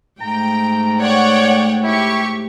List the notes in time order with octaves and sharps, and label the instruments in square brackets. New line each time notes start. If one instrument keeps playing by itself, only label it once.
[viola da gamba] G#2 A3 [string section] G5 [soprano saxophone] A#5
[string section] C#5 F#5 G5 [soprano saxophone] D5
[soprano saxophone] E4 [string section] G4 C#6